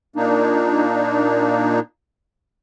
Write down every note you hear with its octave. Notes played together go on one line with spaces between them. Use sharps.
A#2 A#3 D4 D#4